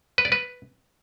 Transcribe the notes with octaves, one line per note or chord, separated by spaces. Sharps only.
B4
D5
B4